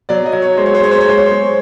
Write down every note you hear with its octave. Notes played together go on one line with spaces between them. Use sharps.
F#3 D5
D#5
F#3
C#5
G#3 C5
C#5
C5
G#3 C#5
C5
C#5
G#3 C5
C#5
C5
G#3